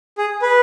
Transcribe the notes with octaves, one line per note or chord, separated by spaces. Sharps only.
G#4
B4